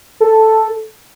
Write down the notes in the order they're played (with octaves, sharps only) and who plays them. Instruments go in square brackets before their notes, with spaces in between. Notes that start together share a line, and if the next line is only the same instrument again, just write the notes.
[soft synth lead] A4